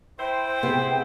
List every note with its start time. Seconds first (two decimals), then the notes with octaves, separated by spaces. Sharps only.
0.20 E4 C5 G5
0.63 C3 B3 G#4